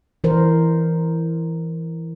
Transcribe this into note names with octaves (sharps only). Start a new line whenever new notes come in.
E3 A#4 C5